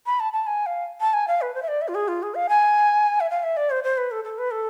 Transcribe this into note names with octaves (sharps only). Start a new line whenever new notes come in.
B5
A5
A5
G#5
F5
A5
G#5
F5
B4
C5
E5
D5
E5
F4
G#4
F4
G#4
F5
G#5
E5
F5
E5
D5
C5
C5
B4
A4
A4
B4
A4